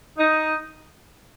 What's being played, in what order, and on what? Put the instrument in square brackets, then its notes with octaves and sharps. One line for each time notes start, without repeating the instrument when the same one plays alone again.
[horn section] D#4